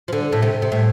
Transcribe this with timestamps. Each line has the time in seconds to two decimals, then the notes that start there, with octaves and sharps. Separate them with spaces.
0.08 F3
0.13 D3
0.32 A2
0.42 C3
0.62 C3
0.72 A2